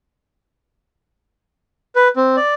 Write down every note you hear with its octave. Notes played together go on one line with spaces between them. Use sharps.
B4
C4
D5